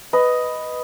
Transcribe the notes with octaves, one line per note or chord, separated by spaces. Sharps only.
B4 D#5